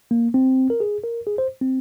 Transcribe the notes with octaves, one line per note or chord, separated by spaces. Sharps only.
A#3
C4
A#4
G#4
A#4
G#4
C5
C4